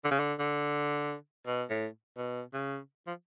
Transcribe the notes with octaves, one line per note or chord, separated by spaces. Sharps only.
D3
C#3
D3
D3
B2
A2
B2
C#3
F3